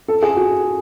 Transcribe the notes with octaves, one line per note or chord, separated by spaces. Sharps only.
A4
G#4
F#4